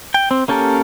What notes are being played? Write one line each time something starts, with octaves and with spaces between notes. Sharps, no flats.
G5
C4
A#3 C#4 G4 A4 A#4